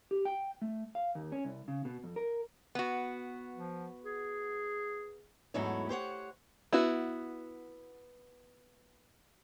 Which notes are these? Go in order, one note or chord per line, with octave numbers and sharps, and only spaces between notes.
G4
G5
A3
F5
D#2
C#4
C2
C#3
B2
F2
A#4
B3 F#4
F3
G#4
E2 G#2 F#3 A3 E4 C#5
G4 C5 C#5 F#5
B3 E4 F#4